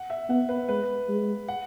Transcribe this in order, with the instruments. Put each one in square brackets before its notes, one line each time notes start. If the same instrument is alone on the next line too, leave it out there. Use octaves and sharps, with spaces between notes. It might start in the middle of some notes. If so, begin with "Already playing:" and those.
Already playing: [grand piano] F#5
E5
[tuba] B3 [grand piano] F#5
[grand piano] B4
[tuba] G#3 [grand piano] B4
[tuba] G#3
[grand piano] F#5